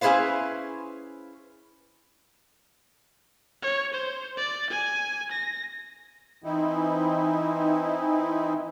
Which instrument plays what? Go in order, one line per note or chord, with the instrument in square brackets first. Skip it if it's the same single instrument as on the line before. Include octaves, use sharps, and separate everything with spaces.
[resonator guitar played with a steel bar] C#4 E4 G#4 B4 C5 F5
[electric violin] C#5
C5
D5
G#5
A#6
[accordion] E3 C4 D#4 E4